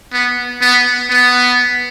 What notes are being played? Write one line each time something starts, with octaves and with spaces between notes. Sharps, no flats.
B3
B3
B3